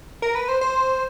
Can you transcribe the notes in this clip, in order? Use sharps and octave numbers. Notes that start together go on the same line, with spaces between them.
A#4
B4
C5
C5